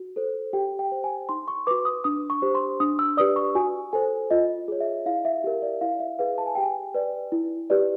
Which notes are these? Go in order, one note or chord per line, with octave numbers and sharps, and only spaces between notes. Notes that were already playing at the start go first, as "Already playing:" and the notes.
Already playing: F#4
A4 C5
G4 G5
G5
C5
G#5
D#4 C6
C#6
F#4 B4 D6
D#6
D4 D#6
C#6
G4 C5
C6
D4 D#6
E6
G4 B4 D5 D#6
C#6
F#4 G#5
A4 C5 G#5
F4 D#5
G#4 C#5
E5
E4 F5
E5
G4 A#4
D5
E4 F5
E5
G#4 B4 F5
A5
G#5
G4 G5
G#5
B4 D5
E4
G4 B4 D5